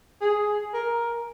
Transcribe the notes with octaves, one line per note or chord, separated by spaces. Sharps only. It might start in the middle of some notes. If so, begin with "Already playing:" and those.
G#4
A#4